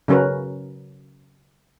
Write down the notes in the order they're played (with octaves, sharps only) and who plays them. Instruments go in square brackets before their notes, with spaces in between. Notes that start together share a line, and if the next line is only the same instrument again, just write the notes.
[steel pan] C#3 F#3 C#4 A#4 B4